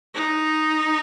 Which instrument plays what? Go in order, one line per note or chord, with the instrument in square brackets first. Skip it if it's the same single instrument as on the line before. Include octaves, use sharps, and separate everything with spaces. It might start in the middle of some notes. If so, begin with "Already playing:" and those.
[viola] D#4